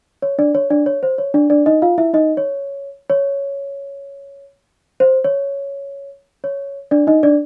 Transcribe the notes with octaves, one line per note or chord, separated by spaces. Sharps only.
C#5
D4 D5
C#5
D4 D5
C#5
C5
C#5
D4 D5
D4 D5
D#4 D#5
F4 F5
E4 E5
D#4 D#5
C#5
C#5
C5
C#5
C#5
D4 D5
D#4 D#5
D4 D5